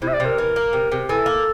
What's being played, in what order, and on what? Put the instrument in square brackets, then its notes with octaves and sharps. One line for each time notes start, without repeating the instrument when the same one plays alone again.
[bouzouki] C3 [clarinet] E4
[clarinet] E5
D5
[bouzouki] C3
[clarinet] A#4
[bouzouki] E3
A#3
C3
C3
[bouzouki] E3 [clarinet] A4
[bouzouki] A#3